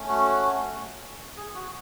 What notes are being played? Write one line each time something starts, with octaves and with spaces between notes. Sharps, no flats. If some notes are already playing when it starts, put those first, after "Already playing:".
Already playing: A3 C#4
F#4
G#4
F#4